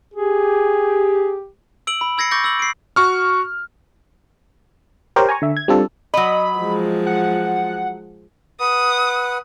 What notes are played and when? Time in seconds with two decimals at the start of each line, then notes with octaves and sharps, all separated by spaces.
0.14 G4 G#4
1.87 E6 D7 F#7
2.01 B5
2.17 B5 E6 G#6 A#6 C7 C#7
2.31 C#6 D6 G6 A6 A#6 C#7
2.44 E6 F#7
2.59 C7 D7
2.96 F#4 C#6 F6
5.16 G4 A#4 C5 C#5 G5
5.29 G#5 A#5 C#6
5.42 D3 E5
5.57 G#6
5.68 G3 C4 D4 F4 A4
6.14 F#3 D#5 B5
6.59 F3 G#3
7.07 F#5
8.60 B4 F#5 D#6